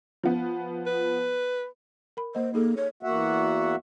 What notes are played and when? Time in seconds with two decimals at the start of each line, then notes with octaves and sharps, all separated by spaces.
0.23 F3 B3
0.86 B4
2.17 A#4 B5
2.35 A#3 C5 D#5
2.54 A#3 D#4 G#4 A4
2.77 C#5
3.03 E2 A#3 F#4 E5 F#5